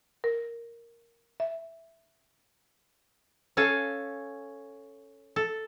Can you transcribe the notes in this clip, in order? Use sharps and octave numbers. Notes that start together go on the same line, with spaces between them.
A#4
E5
C#4 A4 F5 G#5
A4